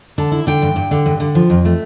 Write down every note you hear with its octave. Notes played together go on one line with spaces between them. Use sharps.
D3 A5
E4
D3 G5
G2
G2
D3
G2
D3
F3
F2
A3